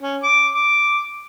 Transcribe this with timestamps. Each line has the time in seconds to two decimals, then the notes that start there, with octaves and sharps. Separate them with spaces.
0.01 C#4
0.23 D6
0.55 D6